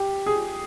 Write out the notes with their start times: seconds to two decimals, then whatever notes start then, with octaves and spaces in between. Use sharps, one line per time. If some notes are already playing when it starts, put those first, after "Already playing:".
Already playing: G4
0.26 G#4